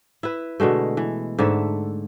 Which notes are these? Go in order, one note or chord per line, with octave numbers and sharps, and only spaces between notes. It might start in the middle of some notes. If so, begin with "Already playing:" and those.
E4 B4
B2 D3 G#3 A3
E3
G#2 D3 A3 E5